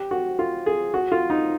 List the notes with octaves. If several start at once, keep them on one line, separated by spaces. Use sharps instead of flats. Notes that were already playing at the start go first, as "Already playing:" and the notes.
Already playing: G4
F#4
F4
G#4
F#4
F4
D#4